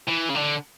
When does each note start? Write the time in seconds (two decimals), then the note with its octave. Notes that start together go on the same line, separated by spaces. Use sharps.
0.09 E3
0.30 C#3
0.36 D3